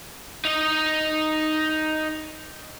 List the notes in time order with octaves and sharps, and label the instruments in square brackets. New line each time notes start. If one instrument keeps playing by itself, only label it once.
[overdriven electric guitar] D#4 D#5